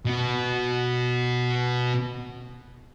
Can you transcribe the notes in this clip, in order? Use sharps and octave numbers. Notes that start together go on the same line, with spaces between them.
B2 B3